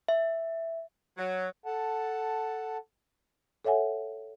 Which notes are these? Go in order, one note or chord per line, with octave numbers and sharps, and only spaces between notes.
E5
F#3
A4 F#5 A5
A4 C#5 E5 F#5 G#5